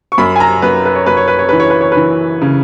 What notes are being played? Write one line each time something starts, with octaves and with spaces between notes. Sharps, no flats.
C#6
F#2 B5
G#5
A#5
F#2 B4
B4
C#5
F#2 B4
C#5
B4
C#5
E3 B4
C#5
B4
C#5
B4
E3
C#3